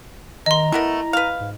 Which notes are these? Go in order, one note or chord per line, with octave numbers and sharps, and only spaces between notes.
D#3 D#5 A#5 C6
A3 B3 E4 A#4
B4 F5
G#2